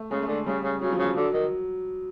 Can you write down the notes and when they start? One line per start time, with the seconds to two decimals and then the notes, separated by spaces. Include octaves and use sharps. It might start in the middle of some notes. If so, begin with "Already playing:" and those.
Already playing: A3
0.11 C#3 G#3
0.22 A3
0.28 D3 G#3
0.46 C#3 G3
0.64 C#3
0.81 C#3 F#3
0.93 F3
0.99 C#3
1.04 F3
1.16 D3 F#3
1.33 D#3